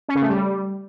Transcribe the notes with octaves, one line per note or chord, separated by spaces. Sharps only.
C#4
C#3
A3
G3